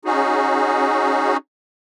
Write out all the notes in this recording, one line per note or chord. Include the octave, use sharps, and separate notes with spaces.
C#4 D#4 F#4 G#4